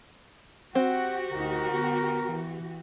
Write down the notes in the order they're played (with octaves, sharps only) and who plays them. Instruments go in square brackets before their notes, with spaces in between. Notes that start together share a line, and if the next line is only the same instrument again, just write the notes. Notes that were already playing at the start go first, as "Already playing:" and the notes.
[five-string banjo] C4 [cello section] F#4 G4 [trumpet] F#5
[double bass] D2 D#4 [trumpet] A#4
[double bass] D3 B3
E3